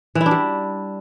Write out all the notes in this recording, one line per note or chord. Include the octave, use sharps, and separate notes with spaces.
E3
E4
D4
G3